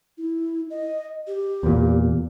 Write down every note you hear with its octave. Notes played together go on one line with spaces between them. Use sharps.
E4
D#5
G4
E2 A#2